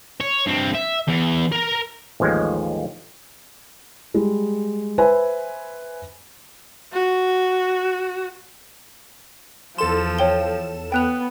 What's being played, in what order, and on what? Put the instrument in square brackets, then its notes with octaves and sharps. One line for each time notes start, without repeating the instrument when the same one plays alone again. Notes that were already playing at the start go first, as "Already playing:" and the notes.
[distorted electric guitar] C#5
G2 C4
E5
E2
A#4 A#5
[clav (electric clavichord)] A1 D#2 F3 G#3
[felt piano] G3 G#3
B4 C5 E5 G#5
[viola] F#4
[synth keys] E2 A4 E7 [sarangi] F3 [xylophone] C6
[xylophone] C#5 G5 G7
[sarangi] B3 [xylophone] G5 F#6 F7